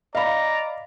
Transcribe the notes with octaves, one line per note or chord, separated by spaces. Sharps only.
D5 D#5 F5 A#5 B5